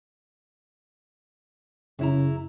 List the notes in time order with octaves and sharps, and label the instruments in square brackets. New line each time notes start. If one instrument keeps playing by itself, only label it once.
[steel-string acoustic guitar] F#2 E4 A#5 [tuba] C#3